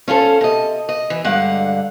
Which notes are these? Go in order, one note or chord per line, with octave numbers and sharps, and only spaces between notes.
C#4 F4 G4 A4 C5
C3 D#5
D#5
E3
G2 D3 G#3 F5 F#5